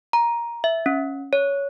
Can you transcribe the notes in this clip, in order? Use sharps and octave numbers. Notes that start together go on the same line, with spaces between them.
A#5
E5
C#4
C#5